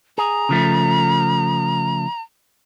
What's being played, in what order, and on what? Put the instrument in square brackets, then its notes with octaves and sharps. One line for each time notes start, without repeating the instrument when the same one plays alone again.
[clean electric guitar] G#4 [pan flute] A#5
[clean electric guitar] C#3 F3 A3